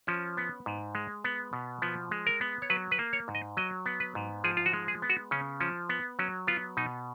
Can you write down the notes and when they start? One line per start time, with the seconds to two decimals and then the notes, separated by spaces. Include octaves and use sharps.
0.07 F3 C#4
0.37 B3
0.66 G#2
0.95 G#3
1.24 B3
1.53 B2
1.82 F3 B3
2.11 G#3
2.27 A#4
2.41 B3
2.62 C#5
2.70 F#3 B4
2.91 B4
2.99 A#3
3.13 C#5
3.28 G#2
3.35 D#5
3.57 F#3 D#5
3.86 B3
4.00 B4
4.15 G#2
4.44 F3 G#4
4.57 F4
4.66 F#4
4.73 G#3
4.88 G#4
5.02 B3
5.10 F#4
5.31 C#3 C#4
5.60 F3 C#4
5.89 B3
6.19 F#3 C#4
6.47 B3 F4
6.77 B2 D#4